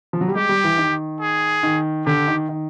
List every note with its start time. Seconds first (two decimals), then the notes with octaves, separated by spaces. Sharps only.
0.13 F3
0.21 F#3
0.28 G3
0.35 G#3 G4
0.49 G3
0.64 E3
0.78 D#3
1.20 G#4
1.63 D#3
2.06 D3 G4
2.28 D#3
2.49 D#3